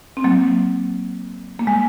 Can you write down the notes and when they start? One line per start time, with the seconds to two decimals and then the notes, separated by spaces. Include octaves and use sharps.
0.17 C4
0.24 F#3 A#3
1.59 A#3
1.67 G#3